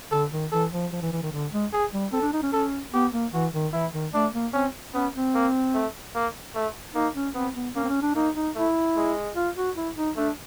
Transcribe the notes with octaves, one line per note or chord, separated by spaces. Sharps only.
D3 A4
D#3
E3 A4
F3
F3
E3
E3
D#3
D3
G#3
G#4
G3
C4 A4
D4
D#4
C#4
C#4 A4
B3 G4
A#3
E3 F#4
D#3
E3 E4
D#3
A3 D4
A#3
C4 C#4
B3 C#4
C4
A#3
A3
A#3
A3
A#3 D#4
C#4
B3 C4
B3
A#3 C#4
C4
C#4
D4
A#3 D#4
D#4
A3 E4
G#3
F4
F#4
E4
D#4
A3 D4